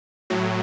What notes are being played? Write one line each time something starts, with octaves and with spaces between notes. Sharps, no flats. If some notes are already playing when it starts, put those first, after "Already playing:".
A2 F#3